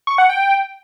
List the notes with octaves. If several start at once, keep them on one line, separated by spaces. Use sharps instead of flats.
C#6
F#5
G5